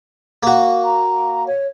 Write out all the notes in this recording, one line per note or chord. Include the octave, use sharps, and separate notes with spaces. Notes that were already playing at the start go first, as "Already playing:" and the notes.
A#3 F#4
A#5
C#5